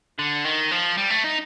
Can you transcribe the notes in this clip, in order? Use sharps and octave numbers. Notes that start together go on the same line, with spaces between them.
D3
D#3
F3
G3
A3
D#4